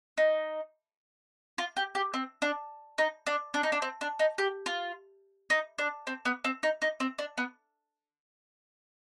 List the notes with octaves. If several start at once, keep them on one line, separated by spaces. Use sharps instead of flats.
D#4
F4
G4
G4
C4
D4
D#4
D4
D4
D#4
D4
C4
D4
D#4
G4
F4
D#4
D4
C4
B3
C4
D#4
D#4
C4
D4
B3